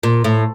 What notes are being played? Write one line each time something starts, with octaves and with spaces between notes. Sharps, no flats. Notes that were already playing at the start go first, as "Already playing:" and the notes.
A#2
A2